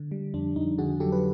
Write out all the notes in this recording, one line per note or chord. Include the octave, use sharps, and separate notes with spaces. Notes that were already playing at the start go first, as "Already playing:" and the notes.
Already playing: D3
G3
F2 D4
F2 D#4
D3 F#4 G#4
F#3 G4 A4
B4